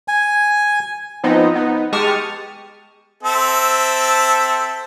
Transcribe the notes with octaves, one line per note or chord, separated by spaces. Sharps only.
G#5
F3 B3 C4 D#4
B3 D#4
G#3 G4 A5 C#6 D#6 F6
C4 A4 E5